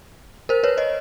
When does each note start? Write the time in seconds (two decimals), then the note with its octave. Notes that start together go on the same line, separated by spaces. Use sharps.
0.49 A#4 C5
0.64 B4 C#5
0.78 C#5 D#5